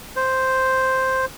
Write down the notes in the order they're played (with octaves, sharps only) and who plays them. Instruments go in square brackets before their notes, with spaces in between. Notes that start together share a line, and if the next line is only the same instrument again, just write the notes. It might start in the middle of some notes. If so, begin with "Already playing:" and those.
[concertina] C5